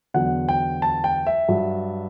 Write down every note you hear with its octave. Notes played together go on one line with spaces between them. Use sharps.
E2 D3 F#3 F#5
G5
A5
G5
E5
G2 F#3